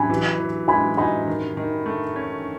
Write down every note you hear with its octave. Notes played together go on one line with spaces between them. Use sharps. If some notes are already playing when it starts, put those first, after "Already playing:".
Already playing: F#3 G#5 B5
E3
E3
G#3 G#5 B5
D#4 G#5 B5
D#3
D#3
A3
C#4